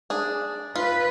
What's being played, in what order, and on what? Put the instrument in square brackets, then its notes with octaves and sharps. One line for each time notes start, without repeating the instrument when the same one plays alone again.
[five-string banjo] D4 G#4
[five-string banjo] F4 [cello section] B4